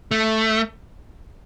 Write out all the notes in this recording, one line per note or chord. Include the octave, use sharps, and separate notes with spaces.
A3